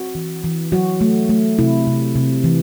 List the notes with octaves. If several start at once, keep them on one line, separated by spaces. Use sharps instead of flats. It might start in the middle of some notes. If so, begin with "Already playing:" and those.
Already playing: C4 F#4
E3
E3
F#3 F#4
A3
A3
C3 E4
C3
C3
E3